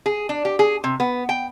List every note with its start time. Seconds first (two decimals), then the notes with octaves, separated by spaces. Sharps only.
0.06 G#4
0.29 D4
0.45 G4
0.59 G#4
0.84 C3
1.00 B3
1.29 G5